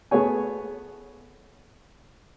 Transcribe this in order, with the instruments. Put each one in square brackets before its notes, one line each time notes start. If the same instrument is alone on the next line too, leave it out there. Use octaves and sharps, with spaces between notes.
[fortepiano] A3 B3 G#4 C#5 G#5